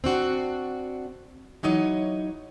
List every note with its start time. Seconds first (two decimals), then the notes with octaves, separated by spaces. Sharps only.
0.04 C4 D4 F#4
1.63 E3 F#3 D#4 C#5 D#5